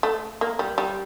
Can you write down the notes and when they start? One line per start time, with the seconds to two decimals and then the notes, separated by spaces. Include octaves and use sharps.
0.03 A3
0.41 A#3
0.59 G3
0.78 G3